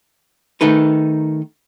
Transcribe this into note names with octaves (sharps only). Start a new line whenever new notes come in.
D#3 A3 D#4 B4